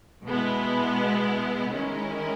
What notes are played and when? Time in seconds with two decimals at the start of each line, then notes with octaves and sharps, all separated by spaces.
0.24 B2 G#3 B3 E4
1.72 D#3 G#3 C#4 E4 A#4